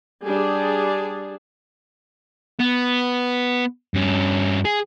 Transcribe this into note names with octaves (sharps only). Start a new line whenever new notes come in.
G3 D4 G#4
B3
G2 C#4
G#4